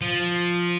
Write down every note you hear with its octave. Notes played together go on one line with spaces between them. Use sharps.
F3